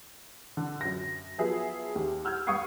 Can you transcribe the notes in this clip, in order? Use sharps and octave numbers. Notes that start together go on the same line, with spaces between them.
D3
F#2 A#6
F3 F#3 B3 G#4 E5
D#2
E6 F6 G6 G#6
G2 F5 C#6 D#6 G#6 C7